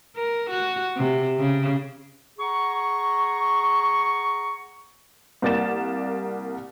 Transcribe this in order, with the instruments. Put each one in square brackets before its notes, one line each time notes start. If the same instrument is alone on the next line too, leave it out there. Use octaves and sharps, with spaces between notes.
[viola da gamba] A#4
F#4
C3
C#3
[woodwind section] G#4 F#5 A#5 C#6
[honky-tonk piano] C2 A#3 D5 F#5 A6 E7